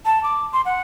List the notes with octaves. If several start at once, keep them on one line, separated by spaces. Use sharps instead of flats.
A5
D6
C6
F#5